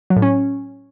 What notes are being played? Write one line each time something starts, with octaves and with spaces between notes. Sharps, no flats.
F#3
A2
C#4